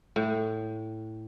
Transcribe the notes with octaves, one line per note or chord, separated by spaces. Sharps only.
A2